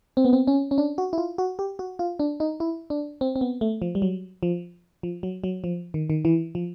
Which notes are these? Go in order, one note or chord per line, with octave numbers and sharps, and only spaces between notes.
C4
B3
C4
C#4
C#4
D4
F#4
E4
F4
F#4
G4
F#4
F4
D4
D#4
E4
D4
C4
C4
B3
A3
F3
G3
F#3
F3
F3
F#3
F#3
F3
D#3
D#3
E3
F3